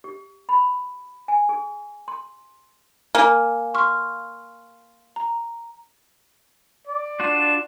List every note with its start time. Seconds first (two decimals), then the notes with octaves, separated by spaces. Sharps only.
0.04 G4
0.49 B5
1.28 G#5
1.49 G#4
2.08 C6
3.15 A#3 G#5
3.74 C6 C#6 F6
5.16 A#5
6.87 D5
7.20 D4 F4 F#4 E7